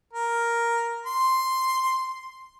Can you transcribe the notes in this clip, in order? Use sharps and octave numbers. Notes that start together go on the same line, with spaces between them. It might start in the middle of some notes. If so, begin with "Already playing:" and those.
A#4
C6